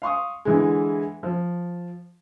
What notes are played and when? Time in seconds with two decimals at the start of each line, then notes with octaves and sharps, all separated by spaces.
0.02 F5 C6 C#6 D#6
0.45 D3 E3 G#3
1.23 F3